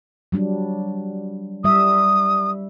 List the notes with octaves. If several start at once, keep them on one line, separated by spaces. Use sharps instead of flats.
F#3 G3 D4
G3 E5 D#6